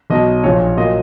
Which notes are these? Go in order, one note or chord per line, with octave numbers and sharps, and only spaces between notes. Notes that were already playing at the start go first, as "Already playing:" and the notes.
B1 B2 F#3 D#5
A#1 A#2 F3 C#5
A#2 F#3 A#3 D#5